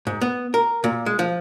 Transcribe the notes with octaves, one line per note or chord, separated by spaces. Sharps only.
G#2
B3
A#4
A#2
G#3
F3